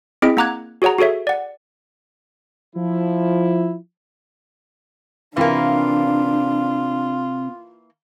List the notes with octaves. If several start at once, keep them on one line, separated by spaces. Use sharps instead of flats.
C4 E4 G#4 D#5 B6 D7
A#3 F#5 A#5 D6 F#6 G#6
F#4 G#4 C#5 F#5 A#5
F#4 G#4 A4 C#5 E5
D5 F#5
F3 E4
C3 E3 A#3 C4 D4 F4 G#5